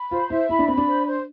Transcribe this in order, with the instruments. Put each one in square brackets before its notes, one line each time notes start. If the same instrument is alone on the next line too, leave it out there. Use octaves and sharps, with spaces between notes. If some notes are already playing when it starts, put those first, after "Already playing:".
Already playing: [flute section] B5
[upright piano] F4 [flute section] C5
[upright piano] E4 [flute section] E5
[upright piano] E4 [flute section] B5
[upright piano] D4
[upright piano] C4 [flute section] B5
[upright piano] D4
[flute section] C5
C5